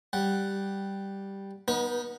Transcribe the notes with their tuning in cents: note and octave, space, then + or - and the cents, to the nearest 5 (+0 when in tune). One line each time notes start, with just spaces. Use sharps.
G3 +0 F#5 +0
B3 -15 D#4 +0 B4 -40